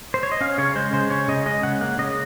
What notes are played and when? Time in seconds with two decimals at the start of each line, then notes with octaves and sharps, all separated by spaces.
0.14 C5
0.23 C#5
0.32 D#5
0.41 C#4 F5
0.58 C#3 C#5
0.75 G#3 C5
0.93 C#3 C5
1.10 C#4 C#5
1.28 C#3 D#5
1.46 G#3 D#5
1.63 C#3 F#5
1.81 A#3 F#5
1.98 C#3 D#5